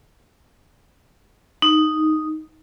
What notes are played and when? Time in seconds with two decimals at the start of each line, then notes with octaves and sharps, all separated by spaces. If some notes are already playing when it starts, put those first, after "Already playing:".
1.62 D#4